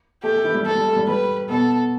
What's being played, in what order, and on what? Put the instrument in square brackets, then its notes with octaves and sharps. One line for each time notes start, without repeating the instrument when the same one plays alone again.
[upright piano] A3 A4 [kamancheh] G4
[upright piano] A3 A4
E3 E4
G3
[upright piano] A3 [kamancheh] A4
[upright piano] G3
A3
G3
[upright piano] G3 [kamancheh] B4
[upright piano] B2 B3 [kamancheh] A4